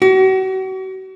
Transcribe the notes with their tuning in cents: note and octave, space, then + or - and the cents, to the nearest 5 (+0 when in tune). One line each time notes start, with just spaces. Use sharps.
F#4 +40